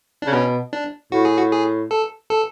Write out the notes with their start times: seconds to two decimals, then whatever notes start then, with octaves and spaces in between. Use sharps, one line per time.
0.22 C#3 D4
0.33 B2 C#4
0.73 D4
1.12 A2 F#4
1.25 G#4
1.38 F#4
1.51 G#4
1.91 A4
2.30 A4